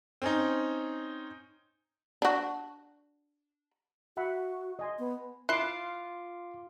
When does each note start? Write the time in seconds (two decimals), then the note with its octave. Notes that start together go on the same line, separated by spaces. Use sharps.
0.22 C4 C#4 D#4
2.22 D4 F#4
4.17 F#4 E5 F#5 B5
4.79 D#5 G#5 C6
4.99 B3
5.49 E4 F4 C6 D6 F#6 C7